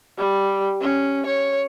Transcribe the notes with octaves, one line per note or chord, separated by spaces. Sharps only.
G3
C#4
C#5